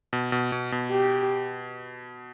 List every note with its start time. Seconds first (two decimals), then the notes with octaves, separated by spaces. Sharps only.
0.13 B2
0.32 B2
0.52 B2
0.72 B2
0.91 G4